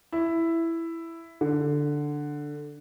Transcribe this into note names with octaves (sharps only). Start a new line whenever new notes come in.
E4
D3